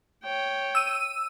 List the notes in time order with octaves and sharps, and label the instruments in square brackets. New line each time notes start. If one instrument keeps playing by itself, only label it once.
[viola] C#5 G5
[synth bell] E6 D#7